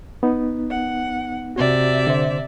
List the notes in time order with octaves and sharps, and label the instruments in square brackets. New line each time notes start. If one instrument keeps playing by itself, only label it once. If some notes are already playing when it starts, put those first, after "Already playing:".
[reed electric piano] B3 D#4
[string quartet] F#5
[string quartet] C3 D5 E5 [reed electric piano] F#4
[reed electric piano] D3 C5